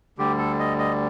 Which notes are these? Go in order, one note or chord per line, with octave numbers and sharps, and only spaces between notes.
D2 D3 G3 G4
A4
D#5
D#5